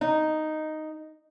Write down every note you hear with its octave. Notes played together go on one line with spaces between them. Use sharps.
D#4